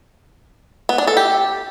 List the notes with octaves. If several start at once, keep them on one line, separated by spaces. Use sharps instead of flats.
B3
D4
A4
G4